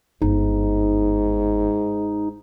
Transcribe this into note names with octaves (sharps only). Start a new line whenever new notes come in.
G1 G#2 D#4